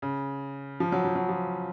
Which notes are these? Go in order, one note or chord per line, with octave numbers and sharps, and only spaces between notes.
C#3
F3
F#3
F3
F#3
F3